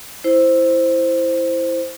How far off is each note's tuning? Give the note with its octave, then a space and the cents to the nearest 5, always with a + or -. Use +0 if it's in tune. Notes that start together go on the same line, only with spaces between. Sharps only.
E4 +0 C5 +0